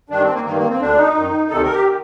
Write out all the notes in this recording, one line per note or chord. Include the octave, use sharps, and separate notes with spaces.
G2 D#3 D4
C4
A#3
G2 D#3 A#3
A#3
C4
D2 D3 D4
D#4
F#2 D#3
D2 C3 D#3 A4
A#4
G4
D#3